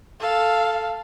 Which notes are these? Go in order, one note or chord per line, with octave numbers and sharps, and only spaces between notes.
A4 F5